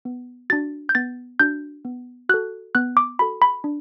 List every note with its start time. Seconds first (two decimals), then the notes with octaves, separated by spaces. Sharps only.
0.05 B3
0.50 D4 F#4 A6
0.89 G6
0.95 B3 A6
1.40 D4 F#4 G6
1.85 B3
2.29 F#4 A4 F#6
2.75 B3 F#6
2.97 D6
3.19 F#4 A4 B5
3.42 B5
3.64 D4